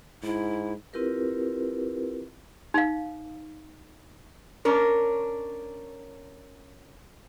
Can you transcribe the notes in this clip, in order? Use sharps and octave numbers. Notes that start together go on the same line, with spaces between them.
G#2 E4
C4 E4 F4 G4 A#4 B4
D#4 F5
C#4 D4 A#4